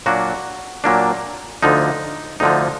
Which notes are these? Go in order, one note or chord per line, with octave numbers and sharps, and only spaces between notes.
A#2 F#3 A#3 D4 F#4
A#2 F#3 A#3 D4
D2 D3 F3 D#4
D2 D3 F3 D#4